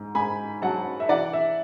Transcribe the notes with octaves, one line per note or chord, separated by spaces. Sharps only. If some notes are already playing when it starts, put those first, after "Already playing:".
Already playing: G#2
G#2 G#5 B5
F#3 F#5 A5
E5
E3 D5 F#5
E5